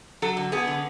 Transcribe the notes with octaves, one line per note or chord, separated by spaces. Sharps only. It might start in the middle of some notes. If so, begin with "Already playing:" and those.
F#3 A4
D3
B3 G#4
D3